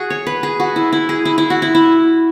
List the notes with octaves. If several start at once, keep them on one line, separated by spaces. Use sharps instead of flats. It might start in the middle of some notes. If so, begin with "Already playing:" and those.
Already playing: F#4 G#4
C#5
B4
G#4
F#4
E4
E4
G#4
E4
E4
F#4
E4
E4